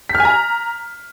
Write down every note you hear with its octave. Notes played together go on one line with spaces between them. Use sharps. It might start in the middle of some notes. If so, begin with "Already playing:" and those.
B6
F6
G#5
A#5